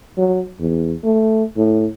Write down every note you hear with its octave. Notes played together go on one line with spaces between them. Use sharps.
F#3
E2
A3
A2